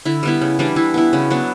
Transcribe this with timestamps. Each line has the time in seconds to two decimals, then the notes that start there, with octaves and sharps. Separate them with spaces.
0.05 D3 E4
0.23 G3 B3 E4
0.41 C#3
0.59 E3 G3 D4
0.76 E3 E4
0.94 B3 E4
1.13 C#3 F#4
1.30 F#3 B3 D4